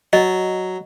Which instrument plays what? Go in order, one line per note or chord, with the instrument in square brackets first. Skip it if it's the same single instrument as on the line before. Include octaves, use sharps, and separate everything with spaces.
[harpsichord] F#3 [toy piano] D#5